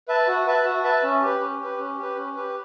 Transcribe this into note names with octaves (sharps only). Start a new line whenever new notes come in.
B4 E5 A5
F#4
B4 E5 A5
F#4
B4 E5 A5
C#4
G4 B4
C#4
G4 B4
C#4
G4 B4
C#4
G4 B4